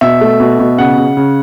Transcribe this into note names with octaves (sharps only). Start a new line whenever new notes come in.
B2 E5
A3
B2
B2
C#3 F#5
C#3
C#3